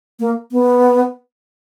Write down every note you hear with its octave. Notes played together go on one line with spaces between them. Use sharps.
A#3
B3